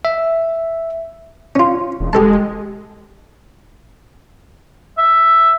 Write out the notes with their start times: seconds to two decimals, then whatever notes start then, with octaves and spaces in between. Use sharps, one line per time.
0.05 E5
1.55 C#4 F4
2.00 E1
2.13 G#3 G4 A4 A5
4.98 E5